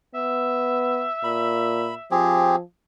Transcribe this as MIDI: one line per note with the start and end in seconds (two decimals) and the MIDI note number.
0.14 1.06 59
0.14 2.18 76
1.24 1.94 46
1.24 1.95 83
2.11 2.61 53
2.11 2.56 60
2.11 2.56 67
2.11 2.56 68